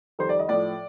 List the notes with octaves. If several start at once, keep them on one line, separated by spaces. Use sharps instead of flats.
F2 D#3 G3 C5
D5
D#5
A2 F3 D5